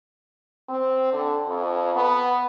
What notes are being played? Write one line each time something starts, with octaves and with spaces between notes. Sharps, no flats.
C4
D3
F2
B3